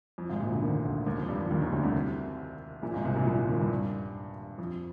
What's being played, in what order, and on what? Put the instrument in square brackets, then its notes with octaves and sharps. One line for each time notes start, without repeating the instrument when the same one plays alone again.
[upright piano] F2
G#1 G#2
A#1 A#2
D2 D3
D#2 D#3
D2 D3
D#2 D#3
F2 F3
G2 G3
F2 F3
D#2 D#3
D#2 D#3
D2 D3
C2 C3
A#1 A#2
G#1 G#2
C2 C3
A#1 A#2
A#1 A#2
C2 C3
D#2 D#3
G2 G3
F2 F3